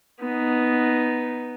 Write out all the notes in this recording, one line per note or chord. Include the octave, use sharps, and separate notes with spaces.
B3 D#4